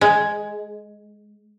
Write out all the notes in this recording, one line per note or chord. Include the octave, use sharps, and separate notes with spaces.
G#3